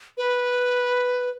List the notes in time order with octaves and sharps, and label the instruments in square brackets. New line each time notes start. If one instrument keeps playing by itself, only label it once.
[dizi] B4